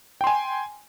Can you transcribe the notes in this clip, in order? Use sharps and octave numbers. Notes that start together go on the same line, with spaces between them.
G5 G#5 C6